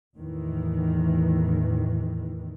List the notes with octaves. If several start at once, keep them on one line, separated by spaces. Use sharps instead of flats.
E2 A2 D#3 E3